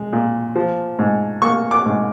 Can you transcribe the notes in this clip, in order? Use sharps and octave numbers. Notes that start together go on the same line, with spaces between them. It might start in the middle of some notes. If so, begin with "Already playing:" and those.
Already playing: G#3
A#2
F3
G#2
A#3 C#6
D6
G#2